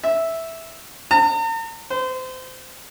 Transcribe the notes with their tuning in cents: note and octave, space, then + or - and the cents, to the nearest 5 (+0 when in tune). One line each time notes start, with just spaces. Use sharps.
E5 -5
A#5 -45
C5 -30